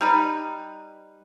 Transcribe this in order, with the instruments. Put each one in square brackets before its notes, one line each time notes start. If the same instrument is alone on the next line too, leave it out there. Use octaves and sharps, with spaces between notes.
[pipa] G3 D#4 B4